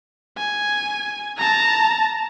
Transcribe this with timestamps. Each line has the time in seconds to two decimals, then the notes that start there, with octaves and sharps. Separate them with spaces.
0.38 G#5
1.38 A5 A#5